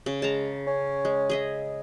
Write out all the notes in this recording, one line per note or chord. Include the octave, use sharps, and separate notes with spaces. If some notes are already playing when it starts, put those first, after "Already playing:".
C#3 C#4
G#3 A5 A#5
C#4
G#3
G#4 D#5 E5